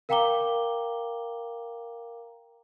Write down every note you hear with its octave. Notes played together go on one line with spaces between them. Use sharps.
A#4 F5 G5 A#5 D6 G7